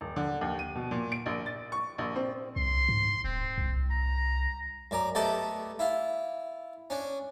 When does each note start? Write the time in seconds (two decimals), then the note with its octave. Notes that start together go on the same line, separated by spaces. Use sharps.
0.01 D#1
0.16 D3
0.41 D#2
0.59 D#7
0.75 B2
0.91 A#2
1.12 D7
1.26 A#1
1.46 A6
1.72 C#6
1.98 A#1
2.16 C4
2.56 C2 C6
2.89 G#2
3.24 D#1 C4
3.58 C2
3.91 A#5
4.91 F#2 D5 A#5
5.15 A3 B3 G4 D5 D#5 A5
5.79 E4 F4
6.90 C#4 D4